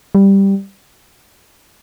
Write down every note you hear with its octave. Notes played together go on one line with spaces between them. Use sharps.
G3